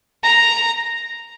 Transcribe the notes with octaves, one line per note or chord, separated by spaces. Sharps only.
A#5